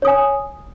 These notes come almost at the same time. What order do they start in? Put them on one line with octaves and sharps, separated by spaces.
C#5 D#6 G#5